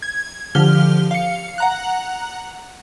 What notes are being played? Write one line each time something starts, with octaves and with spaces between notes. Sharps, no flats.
G#6
D3 F3 G4 F6 G7
F5 C#7
F#5 A#5 F#6